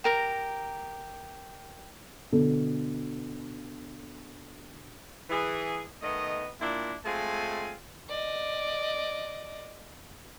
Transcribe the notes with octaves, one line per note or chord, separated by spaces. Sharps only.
G4 A#4 A#5
B2 D3 A4
E3 G#4
D#3 A3 B3 D#5
A#2 A#3 D4 E4
G#3 A3 C4 F4 G#5
D5 D#5